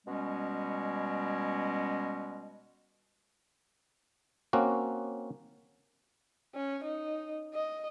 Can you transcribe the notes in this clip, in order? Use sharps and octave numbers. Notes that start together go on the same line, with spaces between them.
B2 G3 G#3 C#4
A#3 C4 C#4 F#4
C#4
D#4
D#5